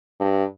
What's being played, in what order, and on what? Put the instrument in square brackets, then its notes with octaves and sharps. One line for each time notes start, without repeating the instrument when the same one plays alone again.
[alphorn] G2